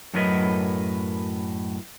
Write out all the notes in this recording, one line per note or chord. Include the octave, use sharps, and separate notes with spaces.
F#2 A2 F#3 A#4 B4 D#5